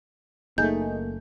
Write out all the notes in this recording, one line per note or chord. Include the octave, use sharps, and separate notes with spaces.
F#1 A3 A#3 D#4 G#4 G6